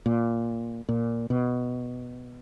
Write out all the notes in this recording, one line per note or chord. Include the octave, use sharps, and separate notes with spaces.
A#2
A#2
B2